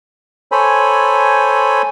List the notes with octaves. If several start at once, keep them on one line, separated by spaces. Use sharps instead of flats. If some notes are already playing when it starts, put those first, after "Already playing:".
A4 C5 C#5 G#5 B5